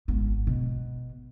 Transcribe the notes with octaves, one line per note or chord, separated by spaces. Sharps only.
G#1 B3
B2